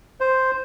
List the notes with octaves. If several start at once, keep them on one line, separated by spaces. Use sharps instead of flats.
C5